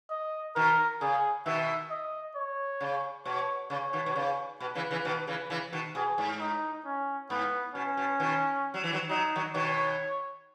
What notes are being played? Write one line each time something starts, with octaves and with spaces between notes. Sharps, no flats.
D#5
B2 D#3 A#4
C#3 G#4
B2 D#3 E5
D#5
C#5
C#3
B2 C#5
C#3 C#5
B2 D#3
B2
C#3
B2 B4
C#3 E3
C#3 E3
B2 D#3
C#3 E3
C#3 E3
B2 D#3
B2 G#4
G#2
D#4
C#4
G#2 B3
B2 C#4
B2
B2 D#3
F#3
E3
D#3 F#3
F#3 D#4
D#3 F#3
B2 D#3 C#5